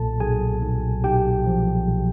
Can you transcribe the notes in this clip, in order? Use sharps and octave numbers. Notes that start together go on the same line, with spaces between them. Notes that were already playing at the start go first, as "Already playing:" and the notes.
Already playing: B1 A#2 A4 A5
B1 G#4 G#5
B1
B1 G4 G5
F3
B1